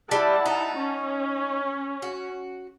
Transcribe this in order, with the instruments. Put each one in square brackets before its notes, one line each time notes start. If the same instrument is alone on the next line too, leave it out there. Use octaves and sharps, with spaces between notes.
[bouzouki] G3 [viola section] E4 F#5 A5
[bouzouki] D#4
[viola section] C#4
[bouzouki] F#4